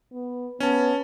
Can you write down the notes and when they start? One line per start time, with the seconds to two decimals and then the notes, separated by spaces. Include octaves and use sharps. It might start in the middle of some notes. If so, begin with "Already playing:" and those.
0.12 B3
0.60 B3 C#4 A5